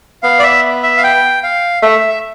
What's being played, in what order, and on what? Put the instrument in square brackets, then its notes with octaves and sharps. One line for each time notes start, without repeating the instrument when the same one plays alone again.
[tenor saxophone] B3 [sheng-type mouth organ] F5
[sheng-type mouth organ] D5
E5
E5
F5
G5
F5
[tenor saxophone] A3 [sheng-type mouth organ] E5